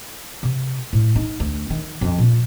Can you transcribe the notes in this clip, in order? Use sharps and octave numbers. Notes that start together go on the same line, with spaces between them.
C3
A2
D#4
D2
D#3
F2
A#2